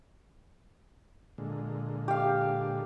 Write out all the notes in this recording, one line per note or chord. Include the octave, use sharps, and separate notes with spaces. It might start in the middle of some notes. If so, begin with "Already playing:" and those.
A#2 D3 G#3
G4 F5